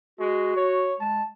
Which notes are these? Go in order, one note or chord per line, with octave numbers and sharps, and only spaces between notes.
G#3 F#4
C#5
G#3 A5